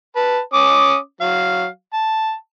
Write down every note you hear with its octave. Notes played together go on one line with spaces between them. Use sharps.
B4 A5
C#4 D6 D#6
F#3 F5
A5